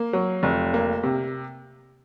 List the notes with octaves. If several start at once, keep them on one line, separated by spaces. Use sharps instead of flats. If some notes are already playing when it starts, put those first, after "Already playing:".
Already playing: A#3
F#3
F1
A#3
C3